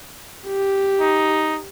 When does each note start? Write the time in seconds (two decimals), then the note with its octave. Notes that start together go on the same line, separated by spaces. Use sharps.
0.48 G4
1.01 D#4